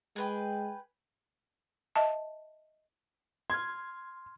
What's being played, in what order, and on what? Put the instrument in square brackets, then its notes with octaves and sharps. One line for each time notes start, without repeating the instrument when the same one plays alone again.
[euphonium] G#3 [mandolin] G#4 B4 G5
[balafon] D#5 E5 A5
[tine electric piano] C6 F6 [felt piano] G#6